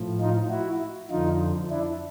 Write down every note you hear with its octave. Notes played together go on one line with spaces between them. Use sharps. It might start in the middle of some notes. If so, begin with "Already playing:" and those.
Already playing: A2 F3
D#4 F4
E4 F#4
F2 D3 F3 D#4 F4
D4 E4